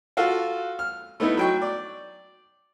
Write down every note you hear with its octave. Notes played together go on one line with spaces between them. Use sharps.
F4 F#4 A4 F5
F6
A3 B3 D#4 E4
F#3 G5 C#6
D5